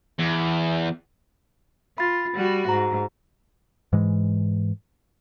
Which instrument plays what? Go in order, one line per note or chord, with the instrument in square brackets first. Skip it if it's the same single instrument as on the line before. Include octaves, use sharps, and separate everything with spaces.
[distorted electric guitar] E2
[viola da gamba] F4 [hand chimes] B5 A6
[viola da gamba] G3 F#4
[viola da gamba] G#2 [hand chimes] A#5
[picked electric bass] G#2 E3 G#3